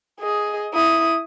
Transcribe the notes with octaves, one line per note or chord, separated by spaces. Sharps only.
G#4 D#5
E4 D#6